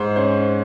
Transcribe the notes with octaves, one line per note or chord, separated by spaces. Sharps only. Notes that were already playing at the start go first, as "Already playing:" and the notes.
Already playing: G#2 C5
C#4 C5